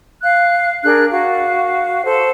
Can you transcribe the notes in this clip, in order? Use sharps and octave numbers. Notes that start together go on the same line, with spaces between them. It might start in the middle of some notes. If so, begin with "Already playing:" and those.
F5 F#6
D4 G#4 A#4 F#6
F#4 F5
A4 C5